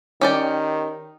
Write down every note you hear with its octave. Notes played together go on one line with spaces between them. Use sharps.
D#3 C#4 G4 D5